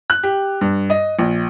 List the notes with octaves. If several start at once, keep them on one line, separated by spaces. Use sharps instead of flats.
F#6
G4
G2
D#5
A#1